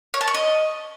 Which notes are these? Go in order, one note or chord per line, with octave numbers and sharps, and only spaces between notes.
C#5
A5
C#6
D#5